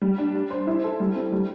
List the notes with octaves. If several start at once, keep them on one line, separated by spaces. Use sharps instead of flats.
G3
D4
D4
C5
E4
A4
G3
C4
G3